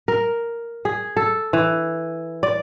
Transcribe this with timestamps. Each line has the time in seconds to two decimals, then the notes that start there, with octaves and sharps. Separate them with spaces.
0.08 A#4
0.85 G#4
1.17 A4
1.53 E3
2.43 D5